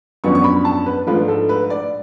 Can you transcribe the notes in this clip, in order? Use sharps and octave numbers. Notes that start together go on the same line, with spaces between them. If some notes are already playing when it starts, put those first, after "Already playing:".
F#2 F3 B3 D4 C#6
C#6
B5
A5
B4
G#2 F3 A3 D4 F4 B4
A4
B4
D5